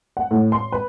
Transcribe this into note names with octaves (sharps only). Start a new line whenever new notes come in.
F#5
A2
C6
B4